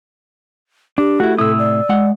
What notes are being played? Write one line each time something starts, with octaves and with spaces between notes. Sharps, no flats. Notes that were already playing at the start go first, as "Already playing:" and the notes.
D4 G4
A3 E4 F#4
A2 C3 E4 A4 D#6 E6
D5
G#3 F#5